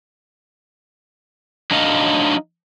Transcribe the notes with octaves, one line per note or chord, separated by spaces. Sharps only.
F#3 D4 D#4 D#5 F5